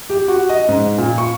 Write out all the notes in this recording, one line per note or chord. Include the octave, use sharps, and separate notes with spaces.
G4
F#4
D#5
G#2
A#2
C#6